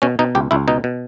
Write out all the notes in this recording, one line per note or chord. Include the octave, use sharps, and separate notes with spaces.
B2 C#4
B2 D#4
C#2 G4
C#2 E4
B2 D#4
B2